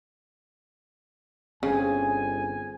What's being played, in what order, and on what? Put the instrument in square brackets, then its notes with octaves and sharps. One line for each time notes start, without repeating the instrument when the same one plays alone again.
[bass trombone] G1 [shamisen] C#3 [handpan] C4 G#4 [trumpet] G#5